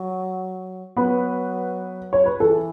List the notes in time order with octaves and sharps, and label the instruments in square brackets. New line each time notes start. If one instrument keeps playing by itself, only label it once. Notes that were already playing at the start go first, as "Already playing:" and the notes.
Already playing: [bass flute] F#3
[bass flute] F#3 [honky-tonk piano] B3 B4
[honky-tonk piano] C#5
B4
[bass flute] E3 [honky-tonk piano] A4